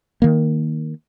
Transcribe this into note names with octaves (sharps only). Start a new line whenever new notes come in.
D#3 A#3